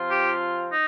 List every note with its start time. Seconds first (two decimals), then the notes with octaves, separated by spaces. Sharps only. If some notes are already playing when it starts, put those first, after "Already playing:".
Already playing: C3 F3 C4 F4
0.10 G4
0.72 D#4